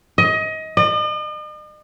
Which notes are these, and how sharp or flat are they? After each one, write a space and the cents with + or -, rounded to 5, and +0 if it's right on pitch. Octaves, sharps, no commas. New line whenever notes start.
D#5 +25
D#5 -45